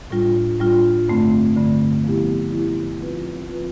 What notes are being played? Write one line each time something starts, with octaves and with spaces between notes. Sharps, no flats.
A2 G3 D4 F4
A2 G3 D4 F4
G2 D3 A3 C4
G2 D3 A3 C4
F3 B3 E4 G4
F3 B3 E4 G4
F3 C4 F4 B4
F3 C4 F4 B4